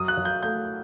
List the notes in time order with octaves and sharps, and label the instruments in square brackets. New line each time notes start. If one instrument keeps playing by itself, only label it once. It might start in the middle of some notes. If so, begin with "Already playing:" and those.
Already playing: [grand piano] F#2 D#6
F#6
F#2
G6
A3 G6